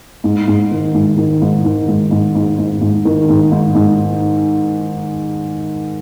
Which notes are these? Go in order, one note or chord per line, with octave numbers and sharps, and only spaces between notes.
G#2
G#2
D#3
G#2
D#3
G#2
D#3
G#2
G#2
G#2
G#2
G#2
D#3
G#2
G#2
G#2